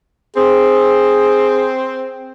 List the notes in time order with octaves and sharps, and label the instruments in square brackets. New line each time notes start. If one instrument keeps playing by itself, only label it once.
[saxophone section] C4 [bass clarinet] G#4